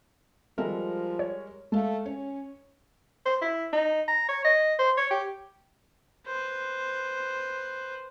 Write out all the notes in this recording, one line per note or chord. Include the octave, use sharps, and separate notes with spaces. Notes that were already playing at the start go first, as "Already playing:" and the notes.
F3 G3 G#3 A4 A#4
C#5
G#3 A3 A4 F5
C#4 C#5
C5
E4
D#4
A#5
C#5
D#5
C5
C#5
G4
B4 C5